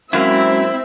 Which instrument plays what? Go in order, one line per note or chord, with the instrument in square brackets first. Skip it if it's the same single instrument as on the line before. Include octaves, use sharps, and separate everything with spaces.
[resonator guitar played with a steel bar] F#2 A#3 [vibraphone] G#3 C#4 F#4 [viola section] C4 E5 [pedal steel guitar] E4